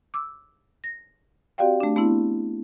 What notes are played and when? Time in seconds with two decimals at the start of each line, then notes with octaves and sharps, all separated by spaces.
0.14 D6 E6
0.84 A#6
1.58 C4 F#4 G4 D5 F5 G5
1.80 A3 D4
1.96 A3 B3 C4 D4 E4